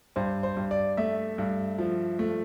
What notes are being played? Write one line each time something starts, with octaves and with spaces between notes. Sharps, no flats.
G2 C5
C5
G2
D5
A3 E5
G2
F3
A3